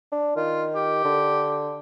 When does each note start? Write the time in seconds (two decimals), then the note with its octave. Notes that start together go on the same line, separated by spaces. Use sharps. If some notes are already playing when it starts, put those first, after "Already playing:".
0.12 D4
0.36 D#3 F4
0.75 G4
1.05 D3